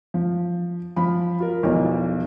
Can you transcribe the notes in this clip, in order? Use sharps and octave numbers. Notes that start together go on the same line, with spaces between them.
F3
F3 B5
F4 A#4
B1 E2 F3